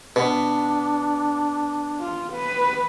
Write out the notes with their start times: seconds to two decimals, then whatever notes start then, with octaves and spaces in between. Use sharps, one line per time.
0.16 B2 D4
2.00 F4
2.33 B4